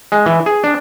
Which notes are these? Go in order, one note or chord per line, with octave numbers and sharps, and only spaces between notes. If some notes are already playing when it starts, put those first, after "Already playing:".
G#3
E3
G#4
D4